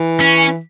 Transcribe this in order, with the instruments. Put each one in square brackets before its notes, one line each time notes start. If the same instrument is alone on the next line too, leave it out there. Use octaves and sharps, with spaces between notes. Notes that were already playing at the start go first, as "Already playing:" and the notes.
Already playing: [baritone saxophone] E3
[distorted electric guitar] C#4